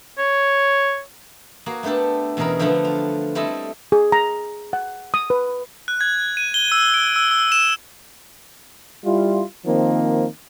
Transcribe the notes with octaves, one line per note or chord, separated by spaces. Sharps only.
C#5
A#3 F#4 G#4
A3 B3 D4 G4 A4
E2 B2 C#4 G#4 A#4 B5
D3 F3 A3 B3 D4
F4
G3 A3 C4 E4 A4 D#5
G#4
A#5
F#5
D#6
B4
F#6
G#6
D#7
G7
E6
D7
E6
E6
E7
G3 E4 F4
D#3 F3 A#3 C4